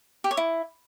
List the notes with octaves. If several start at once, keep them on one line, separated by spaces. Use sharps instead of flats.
G4
C#5
E4